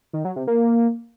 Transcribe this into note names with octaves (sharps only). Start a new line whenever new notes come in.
D#3
F#3
C3
A#3